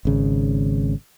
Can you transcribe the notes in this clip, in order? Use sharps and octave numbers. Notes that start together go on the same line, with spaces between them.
G#1 C#3